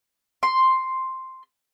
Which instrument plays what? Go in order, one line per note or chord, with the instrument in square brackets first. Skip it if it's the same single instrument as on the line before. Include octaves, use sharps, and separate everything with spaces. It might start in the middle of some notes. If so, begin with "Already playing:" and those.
[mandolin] C6